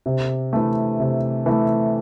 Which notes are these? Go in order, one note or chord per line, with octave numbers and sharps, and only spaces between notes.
C3
E3 A3
C3
E3 A3